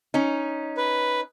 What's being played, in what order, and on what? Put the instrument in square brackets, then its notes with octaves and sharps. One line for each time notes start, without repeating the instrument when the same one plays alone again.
[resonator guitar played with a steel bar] C#4 D#4
[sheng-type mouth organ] B4